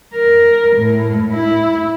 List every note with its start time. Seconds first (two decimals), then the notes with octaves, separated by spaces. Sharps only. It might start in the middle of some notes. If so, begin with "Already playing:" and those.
0.14 A#4
0.76 A2
1.32 E4